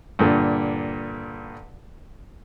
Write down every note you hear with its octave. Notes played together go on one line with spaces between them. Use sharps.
G2 A#2 D3